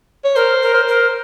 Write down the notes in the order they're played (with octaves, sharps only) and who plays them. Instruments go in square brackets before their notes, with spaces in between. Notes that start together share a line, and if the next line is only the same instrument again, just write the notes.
[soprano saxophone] C#5
[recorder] A#4 [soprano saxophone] C5
[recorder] A#4
[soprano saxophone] C5
[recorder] A#4